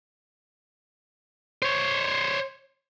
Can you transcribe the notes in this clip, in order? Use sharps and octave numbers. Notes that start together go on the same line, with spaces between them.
C5 C#5